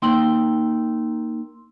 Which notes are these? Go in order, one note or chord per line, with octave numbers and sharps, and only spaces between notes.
A#3 D#4 G5 C6 E6 F#7